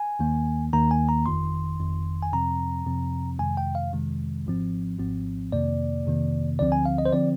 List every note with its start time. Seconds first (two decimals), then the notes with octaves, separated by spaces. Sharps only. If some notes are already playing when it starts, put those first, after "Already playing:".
Already playing: G#5
0.19 D#2 D#3 A#3
0.73 D#2 D#3 A#3 A#5
0.91 G#5
1.09 A#5
1.26 G1 F2 D#3 C6
1.80 G1 F2 D#3
2.23 G#5
2.33 F2 C3 F3 C4 A#5
2.86 F2 C3 F3 C4
3.39 F2 C3 D#3 G#3 G#5
3.57 G5
3.75 F5
3.93 F2 C3 D#3 G#3
4.46 G#1 G#2 F3 C4
4.99 G#1 G#2 F3 C4
5.52 F2 C3 D#3 A#3 D5
6.06 F2 C3 D#3 A#3
6.59 D2 D3 F3 C4 D5
6.72 G#5
6.85 F5
6.98 D#5
7.05 C5
7.12 D3 F3 C4 D5